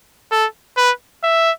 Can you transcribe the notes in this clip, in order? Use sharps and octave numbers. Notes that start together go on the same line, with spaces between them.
A4
B4
E5